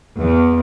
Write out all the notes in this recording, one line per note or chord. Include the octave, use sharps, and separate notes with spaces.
E2